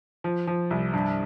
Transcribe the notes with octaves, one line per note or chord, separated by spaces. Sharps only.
F3
F3
C2
G2